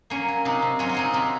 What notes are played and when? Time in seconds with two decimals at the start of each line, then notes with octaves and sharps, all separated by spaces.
0.10 F#3 A#3 C#4
0.28 F#3
0.45 C3 C4 D#4
0.62 C3
0.79 F#3 C#4 F4
0.89 F4
0.94 F#3 C4 D#4
1.13 C3 C4